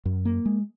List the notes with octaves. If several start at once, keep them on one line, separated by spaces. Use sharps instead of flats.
F#2
A#3
G#3